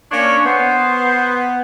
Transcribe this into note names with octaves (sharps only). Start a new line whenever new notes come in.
A#3 C#4 D4 C#5
B3 C5